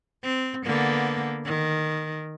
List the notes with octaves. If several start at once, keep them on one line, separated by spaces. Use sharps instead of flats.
C4
D3 A#3 B3
D#3